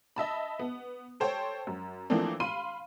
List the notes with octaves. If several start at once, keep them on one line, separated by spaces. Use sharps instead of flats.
D#5 E5 A5 B5
B3
A4 C5 C#5 G5
F#2
E3 F3 A3 A#3 C4 D4
F5 B5 C6 D#7